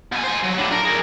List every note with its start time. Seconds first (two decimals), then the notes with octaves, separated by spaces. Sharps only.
0.12 B2 G#5
0.23 C5 G#5
0.44 F#3
0.57 A2 D4
0.72 A#4
0.85 G#4 A#4